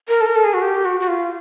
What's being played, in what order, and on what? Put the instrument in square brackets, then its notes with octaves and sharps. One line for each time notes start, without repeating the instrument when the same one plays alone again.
[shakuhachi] A#4
A4
A#4
A4
G#4
F#4
G4
F#4
F#4
F4